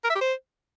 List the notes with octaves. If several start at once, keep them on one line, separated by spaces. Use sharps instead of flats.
A#4
E5
G4
C5